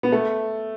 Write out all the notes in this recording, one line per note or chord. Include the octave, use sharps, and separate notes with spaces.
B3
A3